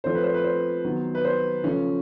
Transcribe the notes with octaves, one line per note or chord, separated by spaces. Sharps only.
F3 A3 C4 C5
B4
C5
B4
C5
D#3 F#3 B3 D#4
B4
C5
C#3 F3 A3 C#4 C#5